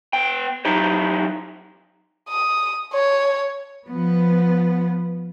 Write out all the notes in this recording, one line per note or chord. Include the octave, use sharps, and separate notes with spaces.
B3 G5
F#3 G3 D#4 E4 G4 C5
D#6
C#5
F3 B3